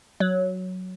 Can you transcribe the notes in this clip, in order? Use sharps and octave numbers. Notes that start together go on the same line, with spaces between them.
F#3